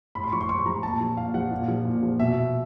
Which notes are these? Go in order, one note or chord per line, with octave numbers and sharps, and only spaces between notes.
A2 B5
C6
F3 C#6
C6
A2 C#6
F3 A#5
A#2 A5
F3
A#2 F5
F3 F#5
A#2
F3
A#2
F3
B2 E5